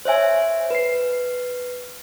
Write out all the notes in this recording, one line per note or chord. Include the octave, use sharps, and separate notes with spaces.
C5 C#5 E5 G#5
B4 C7